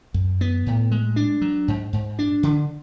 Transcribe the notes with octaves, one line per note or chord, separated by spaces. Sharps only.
F#2
B3
A2
G#3
D4
F#3
G#2
G#2
D4
D3